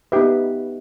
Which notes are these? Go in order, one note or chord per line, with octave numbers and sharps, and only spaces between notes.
B3 D#4 G4 B4 E5